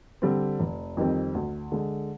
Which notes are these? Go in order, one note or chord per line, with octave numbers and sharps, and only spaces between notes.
D3 G3 C4
F1
F2 D#3 G3 C4
D2
D3 G#3